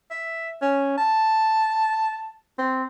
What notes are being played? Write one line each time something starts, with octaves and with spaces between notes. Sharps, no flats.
E5
C#4
A5
C4